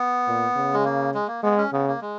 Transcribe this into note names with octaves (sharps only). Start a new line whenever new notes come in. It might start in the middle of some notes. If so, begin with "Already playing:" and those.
Already playing: B3
A#2
C#3
G#3
A#3
G#3
A#3
G#3 B3
C#4
C#3 B3
A#3
G#3